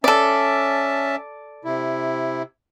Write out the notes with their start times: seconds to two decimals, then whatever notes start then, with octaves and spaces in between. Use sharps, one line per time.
0.04 C#4 A4 D5 E5 A5
1.65 C3 E4